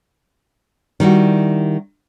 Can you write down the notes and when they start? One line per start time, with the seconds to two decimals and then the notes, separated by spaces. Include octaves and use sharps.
1.00 D#3 G3 E4 F#4